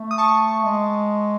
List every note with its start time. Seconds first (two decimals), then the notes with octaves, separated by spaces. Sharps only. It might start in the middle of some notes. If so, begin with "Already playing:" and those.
Already playing: A3
0.11 D#6
0.18 A5 C#6
0.65 G#3